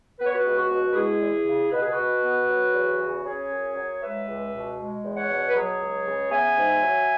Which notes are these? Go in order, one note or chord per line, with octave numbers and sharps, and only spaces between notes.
B3 B4
C#5
F#4 B4
C#2
F#4
B2
B4
G#3 E4 G#4
E2
C#3
B2 B4
G#4
F#4 B4
B2
B3
F#3
E2
C#3
C#4 G#4 C#5
F#2
F#3
G#3 B4 E5
C#2
B2
G#3
E2
C#5 F#5
B2
B4
F#3 G#4 C#5
C#2
C#3
B3 E5 G#5
G#2
F#3